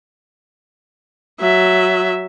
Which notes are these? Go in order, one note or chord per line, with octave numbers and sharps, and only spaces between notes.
F#3 E5